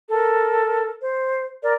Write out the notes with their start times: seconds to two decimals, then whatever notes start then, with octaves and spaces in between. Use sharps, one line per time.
0.10 A4 A#4
0.99 C5
1.62 A#4 D5